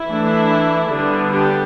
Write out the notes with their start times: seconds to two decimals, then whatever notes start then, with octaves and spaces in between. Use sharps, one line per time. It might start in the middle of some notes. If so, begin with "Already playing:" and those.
Already playing: E4
0.08 E3 A3 D4
0.92 D3 G3 B3 D4
1.32 D4 G4